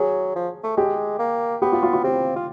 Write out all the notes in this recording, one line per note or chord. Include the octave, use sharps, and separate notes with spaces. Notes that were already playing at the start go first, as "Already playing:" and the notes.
Already playing: F#3 G#4
F3
A3
G#3 G4
A#3
B3 G4
F4
F4
F4
C4 G4
F4